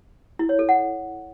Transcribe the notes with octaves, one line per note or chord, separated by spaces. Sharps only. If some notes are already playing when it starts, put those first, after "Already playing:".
E4
C#5
A4
F#5